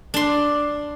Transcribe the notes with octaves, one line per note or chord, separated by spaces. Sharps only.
D4 C6